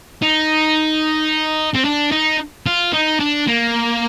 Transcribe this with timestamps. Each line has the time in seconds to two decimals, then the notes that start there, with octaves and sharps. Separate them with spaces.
0.23 D#4
1.75 C4
1.85 D4
2.12 D#4
2.66 F4
2.93 D#4
3.20 D4
3.48 A#3